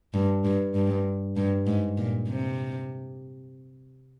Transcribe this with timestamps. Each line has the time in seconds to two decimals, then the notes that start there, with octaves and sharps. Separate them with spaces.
0.14 G2
0.44 G2
0.74 G2
1.37 G2
1.67 G#2
1.97 A#2
2.29 C3